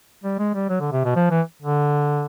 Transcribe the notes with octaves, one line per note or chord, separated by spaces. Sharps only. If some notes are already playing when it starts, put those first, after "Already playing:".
G3
G#3
G3
F#3
D3
C3
B2
F3
E3
D3